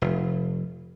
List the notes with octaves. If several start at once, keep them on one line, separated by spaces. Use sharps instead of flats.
F1